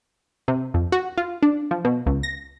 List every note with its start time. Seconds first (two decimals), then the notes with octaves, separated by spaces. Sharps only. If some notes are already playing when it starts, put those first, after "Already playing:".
0.48 C3
0.74 F2
0.92 F#4
1.18 F4
1.43 D4
1.71 F3
1.85 B2
2.06 C#2
2.23 A#6